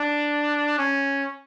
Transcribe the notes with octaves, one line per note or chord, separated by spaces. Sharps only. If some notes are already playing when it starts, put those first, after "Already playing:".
Already playing: D4
C#4